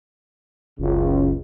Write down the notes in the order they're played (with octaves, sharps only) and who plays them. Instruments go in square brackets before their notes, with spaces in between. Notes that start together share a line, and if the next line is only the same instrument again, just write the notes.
[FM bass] F#1 [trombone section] C#2